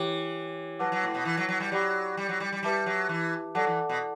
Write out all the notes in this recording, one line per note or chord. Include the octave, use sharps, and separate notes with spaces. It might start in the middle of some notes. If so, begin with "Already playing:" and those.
Already playing: E3 E4 G4 C#5 G5 D6
F#3 B4 F#5 A5 D6
F#3
A2
B2
E3
F#3
F#3
G3
F#3 G4 D5 G5 B5 D6
G3
F#3
G3
G3
G3 G4 B4 E5 A5 D6
F#3
E3
F#3 A4 D5 F#5 A5 D6
E3
B2